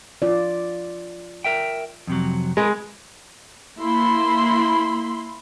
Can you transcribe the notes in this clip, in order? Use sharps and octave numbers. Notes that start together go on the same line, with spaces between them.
F4 D5
A#4 E5 G5
F2 C3 F#3
G#3 A#4 B4
A#3 E4 B5 C6